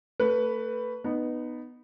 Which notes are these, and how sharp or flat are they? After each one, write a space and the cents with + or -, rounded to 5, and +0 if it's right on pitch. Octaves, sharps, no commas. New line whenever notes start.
A3 +30 B4 +0
B3 +0 D#4 -20